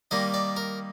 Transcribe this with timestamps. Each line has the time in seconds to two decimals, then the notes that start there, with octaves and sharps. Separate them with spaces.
0.11 D#3 G3 A#3 D#5
0.34 D5
0.57 A#4